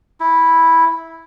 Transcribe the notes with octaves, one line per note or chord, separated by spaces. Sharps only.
E4